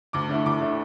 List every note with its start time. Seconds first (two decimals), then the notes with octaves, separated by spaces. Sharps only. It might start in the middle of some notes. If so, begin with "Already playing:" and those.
0.13 D2 D6
0.29 D3 A3 E4
0.46 D2 D6
0.61 D3 A3 E4